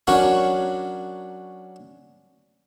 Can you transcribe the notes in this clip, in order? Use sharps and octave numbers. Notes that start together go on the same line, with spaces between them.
F#3 C#4 D4 F#4 A#4 C#5